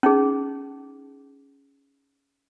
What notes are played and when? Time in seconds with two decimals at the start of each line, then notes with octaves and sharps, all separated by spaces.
0.03 C#4 D#4 G#4